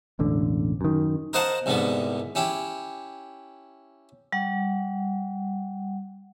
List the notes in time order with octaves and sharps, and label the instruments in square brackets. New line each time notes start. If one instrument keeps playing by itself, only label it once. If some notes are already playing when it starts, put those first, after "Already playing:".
[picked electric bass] E1 A1 D3
F#2 D#3
[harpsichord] A#4 C5 D#5 F5 F#5 A5
C2 G#2 D3 B3
C#4 E4 G4
[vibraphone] G3 F#5